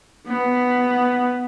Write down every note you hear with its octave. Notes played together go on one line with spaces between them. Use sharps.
B3